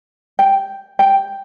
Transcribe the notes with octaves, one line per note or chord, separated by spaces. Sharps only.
G5
G5